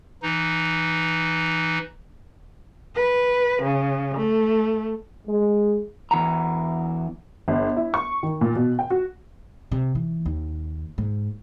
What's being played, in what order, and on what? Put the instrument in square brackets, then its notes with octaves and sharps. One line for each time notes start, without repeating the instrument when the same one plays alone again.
[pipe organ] E3 D#4
[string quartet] B4
C#3
A3
[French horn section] G#3
[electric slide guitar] E2 G2 E3 F#4 A#5
[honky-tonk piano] G1
E4
C#6
D#3
A#2
B2
G5
F#4
[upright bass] C3
E3
D#2
G#2